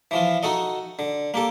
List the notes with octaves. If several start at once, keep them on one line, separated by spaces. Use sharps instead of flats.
E3 F3 F4
D#4 F#4 A4 D#5
D3
A#3 G4 A4